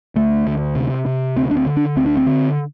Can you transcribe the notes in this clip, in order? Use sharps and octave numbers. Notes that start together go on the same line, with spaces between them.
D2 A3
D2
C3
C3
D2 C4
D4
C4
D3
D4
D2 C4
D4
C4
D3